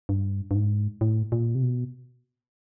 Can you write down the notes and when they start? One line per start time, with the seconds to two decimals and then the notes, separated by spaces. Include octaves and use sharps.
0.09 G2
0.51 G2
0.55 G#2
1.01 A2
1.32 A#2
1.55 C3
1.63 B2